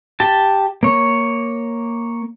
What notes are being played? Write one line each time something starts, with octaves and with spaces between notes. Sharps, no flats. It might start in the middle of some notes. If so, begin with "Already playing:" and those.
G4 A5
A#3 C#5